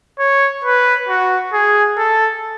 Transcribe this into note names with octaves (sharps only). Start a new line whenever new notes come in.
C#5
B4
F#4
G#4
A4